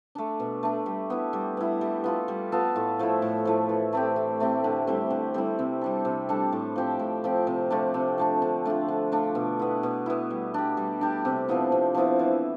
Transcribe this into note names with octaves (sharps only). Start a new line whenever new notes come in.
A3 D4
B2
A3 D4
G3
B3 E4
G3
B3 E4
G3
B3 F4 A4
G3
B3 F4 A4
A2
F3 A3 E4
A2
F3 A3 E4
E3
A3 C4 G4
E3
A3 C4 G4
D3
G3 C4 E4
D3
G3 C4 E4
C3
G3 D4 A4
C3
G3 D4 A4
A2
F3 C4 G4
A2
F3 C4 G4
C3
F3 A3 D4
C3
F3 A3 D4
D3
A3 D4 F4
D3
A3 D4 F4
B2
B3 E4
B2
B3 E4
G3
D4 G4
G3
D4 G4
C3
F3 B3 E4
C3
F3 B3 E4
E3